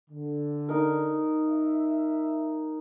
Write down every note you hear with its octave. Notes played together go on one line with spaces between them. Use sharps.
D3
D#4 A#4
E5